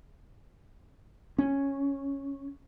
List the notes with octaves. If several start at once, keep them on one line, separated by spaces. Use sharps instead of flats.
C#4